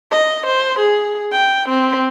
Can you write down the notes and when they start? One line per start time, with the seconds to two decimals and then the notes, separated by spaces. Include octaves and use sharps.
0.12 D#5
0.47 C5
0.80 G#4
1.33 G5
1.69 C4